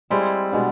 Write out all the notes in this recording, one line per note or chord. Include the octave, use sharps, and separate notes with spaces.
G3 G#3 C4 E4 G#4
B2 G#3 B3 D4